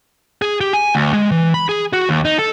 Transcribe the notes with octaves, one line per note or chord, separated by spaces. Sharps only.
G#4
G4
G#5
D2
G#3
E3
B5
G#4
F#4
D#2
D#4
A4